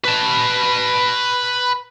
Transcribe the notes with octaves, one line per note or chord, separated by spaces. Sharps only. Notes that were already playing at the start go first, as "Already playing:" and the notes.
B4 A5